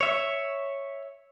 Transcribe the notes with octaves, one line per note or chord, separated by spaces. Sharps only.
C#5 E5